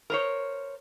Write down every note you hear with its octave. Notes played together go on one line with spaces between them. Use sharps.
A#4 C5 C#5